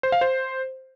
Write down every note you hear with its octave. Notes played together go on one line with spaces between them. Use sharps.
C5
F5
C5